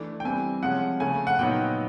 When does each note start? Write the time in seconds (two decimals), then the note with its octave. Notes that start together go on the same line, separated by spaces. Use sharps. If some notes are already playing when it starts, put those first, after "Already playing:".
Already playing: E3 A3 D4
0.20 G5
0.25 E3 G3 C4 G#5
0.62 C3 F3 G#3 C#4 F#5
1.00 C#3 F3 A3 G#5
1.27 F#5
1.39 A#2 F#3 B3 D#4 G5